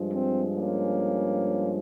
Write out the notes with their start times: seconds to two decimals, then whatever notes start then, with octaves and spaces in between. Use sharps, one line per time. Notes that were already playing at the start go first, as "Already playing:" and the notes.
Already playing: G2 F3 G#3
0.11 C4
0.56 A#3 C#4